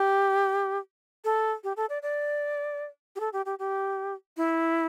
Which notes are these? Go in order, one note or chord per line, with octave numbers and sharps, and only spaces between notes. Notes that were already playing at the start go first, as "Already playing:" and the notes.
Already playing: G4
A4
G4
A4
D5
D5
G4
A4
G4
G4
G4
E4